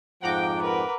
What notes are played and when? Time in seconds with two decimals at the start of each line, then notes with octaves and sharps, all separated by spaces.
0.22 F2 G#2 F3 F#5 G5 A#5 D6
0.62 A#4 B4